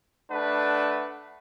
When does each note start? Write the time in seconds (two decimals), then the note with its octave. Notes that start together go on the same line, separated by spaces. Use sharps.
0.31 A3 D4 B4 F#5